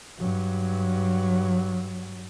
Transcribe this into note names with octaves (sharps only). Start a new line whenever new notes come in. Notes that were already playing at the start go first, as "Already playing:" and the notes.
G2 F#3